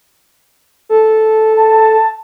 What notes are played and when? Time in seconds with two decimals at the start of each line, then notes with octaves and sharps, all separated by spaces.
0.89 A4
1.56 A5